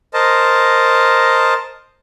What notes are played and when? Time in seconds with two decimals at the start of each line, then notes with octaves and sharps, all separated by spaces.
0.14 A#4 C5 D#5 A5